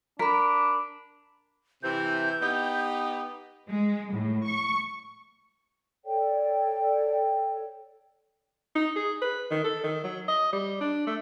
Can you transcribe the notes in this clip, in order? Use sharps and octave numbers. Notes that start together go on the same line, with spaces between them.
D4 A#4 B5 B6
C3 E3 G6
B3 D#4 G4
G#3
A2
C#6
A4 C#5 D5 G5
D#4
G#4
B4
D#3
A4
D#3
F#3
D#5
G3
D4
A3